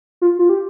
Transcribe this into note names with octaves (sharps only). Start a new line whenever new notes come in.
F4
F4
G4